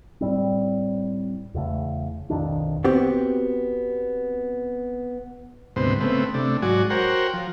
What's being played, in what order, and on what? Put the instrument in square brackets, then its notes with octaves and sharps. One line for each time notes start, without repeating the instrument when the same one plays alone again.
[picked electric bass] A2 G3 C4
E2 C#3 A3
B1 F2 D#3 D4
[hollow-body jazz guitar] B3 C4 F#4 G4 C5
[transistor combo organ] D2 G#2 C3 B3 C5
C#3 A3 B3 C4
C3 A3 D4
G#2 F#3 F#4 D5 G#5
F#4 A#4 C5 C#5 F#5 G5
F3